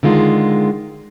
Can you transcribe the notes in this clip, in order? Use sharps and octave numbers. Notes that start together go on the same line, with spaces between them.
D3 D#3 G#3 F4